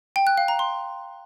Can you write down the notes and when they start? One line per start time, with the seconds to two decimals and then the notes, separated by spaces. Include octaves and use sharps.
0.16 G5
0.27 F#6
0.37 F5
0.48 A#5
0.59 C6